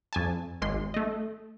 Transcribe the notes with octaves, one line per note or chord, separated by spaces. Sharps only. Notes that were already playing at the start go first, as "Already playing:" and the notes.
F2 G#5 A5
G#1 G#3 C6
A3 D#5